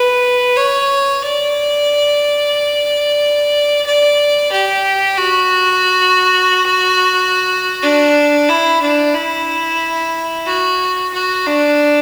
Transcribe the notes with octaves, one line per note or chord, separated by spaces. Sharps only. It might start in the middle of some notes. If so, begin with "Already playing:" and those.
Already playing: B4
C#5
D5
D5
G4
F#4
D4
E4
D4
E4
F#4
F#4
D4